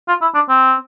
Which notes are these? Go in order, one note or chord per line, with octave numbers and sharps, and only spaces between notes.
F4
E4
D4
C4